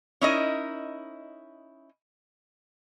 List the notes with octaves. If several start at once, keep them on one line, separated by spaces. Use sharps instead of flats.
C#4 D#4 E4 A#4 D#5